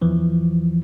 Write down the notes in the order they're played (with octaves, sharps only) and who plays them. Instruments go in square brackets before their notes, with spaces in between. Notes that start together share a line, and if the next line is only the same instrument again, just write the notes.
[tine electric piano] E2 E3 F3